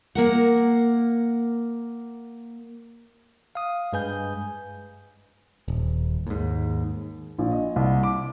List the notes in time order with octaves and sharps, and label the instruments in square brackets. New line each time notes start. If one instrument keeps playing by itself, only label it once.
[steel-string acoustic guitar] A#3 A#4 F#5
[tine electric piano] F5 D#6
G2 G#3 B4 G#5 G6
[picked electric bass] D#1
D#2 G#2
[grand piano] A#1
D#5
C2
D6